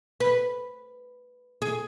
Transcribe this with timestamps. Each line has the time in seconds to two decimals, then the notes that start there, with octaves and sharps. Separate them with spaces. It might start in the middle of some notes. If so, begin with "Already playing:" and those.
0.20 B4
1.62 G#4